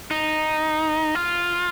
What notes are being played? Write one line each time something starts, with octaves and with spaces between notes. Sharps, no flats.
D#4
F4